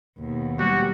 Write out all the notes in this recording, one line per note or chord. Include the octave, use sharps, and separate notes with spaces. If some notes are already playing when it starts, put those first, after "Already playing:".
D#2 B2
F#3 G3 F#4